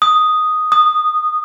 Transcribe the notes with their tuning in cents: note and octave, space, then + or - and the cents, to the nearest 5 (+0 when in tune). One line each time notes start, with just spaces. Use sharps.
D#6 +0
D#6 -15